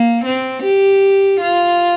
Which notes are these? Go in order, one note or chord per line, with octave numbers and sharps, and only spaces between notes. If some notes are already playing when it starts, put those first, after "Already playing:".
Already playing: A#3
C4
G4
F4